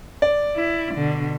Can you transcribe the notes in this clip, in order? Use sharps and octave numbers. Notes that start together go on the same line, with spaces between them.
D5
E4
B2 D3